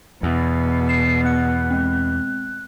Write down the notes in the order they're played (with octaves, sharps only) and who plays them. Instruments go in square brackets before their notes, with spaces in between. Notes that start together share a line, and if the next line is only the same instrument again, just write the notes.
[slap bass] E2 [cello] B2
[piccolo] C7 [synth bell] E7
[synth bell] B3 F#5 C#7 [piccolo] F#6
[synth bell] G#3 C4